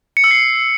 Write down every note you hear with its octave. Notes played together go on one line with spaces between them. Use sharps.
C#7
E6
C7